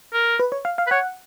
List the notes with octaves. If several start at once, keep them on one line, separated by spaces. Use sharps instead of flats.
A#4
B4
C#5
F5
F5
B4
C#5 F#5